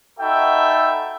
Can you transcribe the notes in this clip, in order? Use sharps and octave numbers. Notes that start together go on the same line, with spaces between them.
D#4 F#4 A4 E5 G5 B5